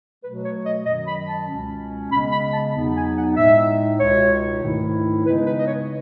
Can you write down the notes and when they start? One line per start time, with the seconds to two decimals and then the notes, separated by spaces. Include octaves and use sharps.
0.24 B2 F#3 A3 B4
0.45 C#5
0.66 D#5
0.86 F#2 D#3 F#3 D#5
1.08 B5
1.28 A5
1.49 C#2 B2 G#3 C#4
2.12 C#3 G#3 B3 B5
2.32 B5
2.54 A5
2.74 E2 B2 F#3 B3 D#4
2.96 G#5
3.16 F#5
3.37 A2 G#3 D#4 E5
4.00 C#2 B2 G#3 D#4 C#5
4.63 G#2 D#3 A3 E4
5.26 C#3 G#3 B3 D#4 B4
5.47 B4
5.59 D#5
5.67 C#5